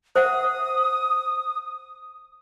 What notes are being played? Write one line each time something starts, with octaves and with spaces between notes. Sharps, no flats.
C5 E5 F#5 D#6